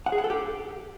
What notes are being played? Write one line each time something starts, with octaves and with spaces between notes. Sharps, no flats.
F#5
G#4
F#5
A4
G4